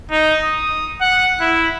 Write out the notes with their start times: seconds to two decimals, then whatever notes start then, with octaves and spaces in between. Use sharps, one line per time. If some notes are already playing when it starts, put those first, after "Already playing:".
0.11 D#4
0.43 D#6
1.01 F#5
1.41 E4